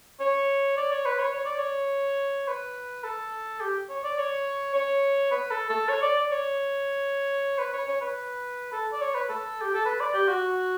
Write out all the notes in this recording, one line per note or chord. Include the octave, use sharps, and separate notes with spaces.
C#5
D5
C#5
B4
C#5
C#5
D5
C#5
B4
A4
G4
C#5
D5
C#5
C#5
B4
A4
A4
C#5
D5
D5
C#5
B4
C#5
C#5
B4
A4
D5
C#5
B4
A4
G4
A4
B4
D5
G4
F#4